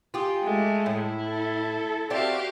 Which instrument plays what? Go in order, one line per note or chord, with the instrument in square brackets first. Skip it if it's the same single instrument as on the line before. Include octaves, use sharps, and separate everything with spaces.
[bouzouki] F4 G4 G#4
[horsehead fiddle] G#3 A3
[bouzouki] A2 [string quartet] E4
[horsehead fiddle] A4
[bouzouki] C4 D5 E5 [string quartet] F#4 G4 F5